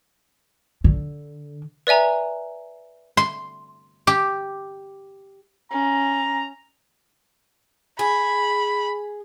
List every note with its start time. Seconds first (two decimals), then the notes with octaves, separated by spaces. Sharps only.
0.84 D3
1.87 B4 D5 E5 G#5 A#5
3.17 C6
4.07 G4
5.71 C#4 A#5
7.99 G#4 B5